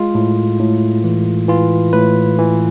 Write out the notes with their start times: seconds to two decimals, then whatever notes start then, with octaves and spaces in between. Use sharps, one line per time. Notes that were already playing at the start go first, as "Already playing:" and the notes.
Already playing: G#3 F4
0.15 A2
0.59 A2
1.04 E3
1.48 E3 F4
1.93 A2 B4
2.39 E3